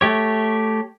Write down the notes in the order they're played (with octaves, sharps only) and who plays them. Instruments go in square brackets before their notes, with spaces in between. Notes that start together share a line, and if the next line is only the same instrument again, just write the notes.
[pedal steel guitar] A3 G4 C#5